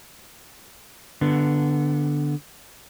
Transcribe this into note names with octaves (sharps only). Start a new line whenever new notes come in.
D3 B3